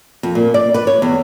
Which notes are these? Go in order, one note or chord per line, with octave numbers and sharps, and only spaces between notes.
F2
A#2
D5
B4
C#5
E2